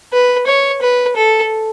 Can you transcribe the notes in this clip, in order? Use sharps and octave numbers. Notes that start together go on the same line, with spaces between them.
B4
C#5
B4
A4